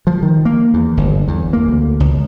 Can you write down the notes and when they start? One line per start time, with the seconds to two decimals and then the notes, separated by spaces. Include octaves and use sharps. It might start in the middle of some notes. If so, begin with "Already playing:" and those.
0.07 F3
0.23 D#3
0.45 A#3
0.74 E2
0.97 G1
1.28 E2
1.53 A#3
1.68 D2
2.00 C#2